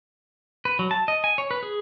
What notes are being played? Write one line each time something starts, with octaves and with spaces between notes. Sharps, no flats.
B4
F#3
A5
D#5
G#5
C#5
B4
G#4